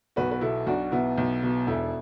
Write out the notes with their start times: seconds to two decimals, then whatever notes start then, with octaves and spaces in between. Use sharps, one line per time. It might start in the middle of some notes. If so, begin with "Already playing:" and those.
0.16 B1 F#4 B4
0.31 B4
0.41 B2 E4 A4
0.66 B1 D4 F#4
0.92 B2 B3 E4
1.18 B1
1.43 B2
1.67 E1 E4 A4